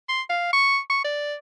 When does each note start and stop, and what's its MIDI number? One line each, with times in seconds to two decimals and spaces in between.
0.09 0.22 84
0.30 0.49 77
0.53 0.79 85
0.90 1.00 85
1.04 1.35 74